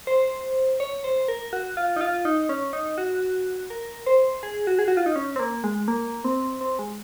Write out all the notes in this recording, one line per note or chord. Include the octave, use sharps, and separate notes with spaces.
C5
C#5
C5
A#4
F#4
F4
D#4
F4
D#4
C#4
D#4
F#4
A#4
C5
G#4
F#4
G#4
F#4
F4
D#4
C#4
C4
A#3
G#3
A#3
C4
C4
G#3